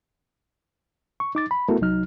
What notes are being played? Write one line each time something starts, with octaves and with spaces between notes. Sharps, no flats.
C#6
D#4 D6 A6
B5
A3 B3 E4 F#4 A4 A#4
C2 F#3 D#4 F6